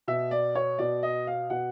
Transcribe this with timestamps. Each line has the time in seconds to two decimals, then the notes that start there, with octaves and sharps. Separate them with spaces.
0.08 B2 E5
0.31 D5
0.55 C#5
0.78 B2 D5
1.03 D#5
1.27 F5
1.50 B2 F#5